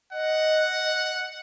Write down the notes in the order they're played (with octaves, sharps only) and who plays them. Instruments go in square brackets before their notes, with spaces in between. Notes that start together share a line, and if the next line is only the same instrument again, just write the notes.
[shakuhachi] D#5 [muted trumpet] F#5